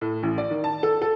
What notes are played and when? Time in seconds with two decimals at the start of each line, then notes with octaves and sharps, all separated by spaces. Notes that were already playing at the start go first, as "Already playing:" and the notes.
0.01 A2
0.23 A1
0.38 D5
0.51 D#3
0.64 A5
0.83 A4
1.02 A4